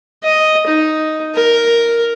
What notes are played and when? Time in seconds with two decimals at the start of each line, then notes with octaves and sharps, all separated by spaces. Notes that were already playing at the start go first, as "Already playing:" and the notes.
0.24 D#5
0.67 D#4
1.35 A#4